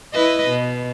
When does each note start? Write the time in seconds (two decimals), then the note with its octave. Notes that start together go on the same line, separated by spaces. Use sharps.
0.13 E4 B4 D#5
0.48 B2